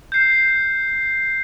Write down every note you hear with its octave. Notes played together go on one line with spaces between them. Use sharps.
G6 C7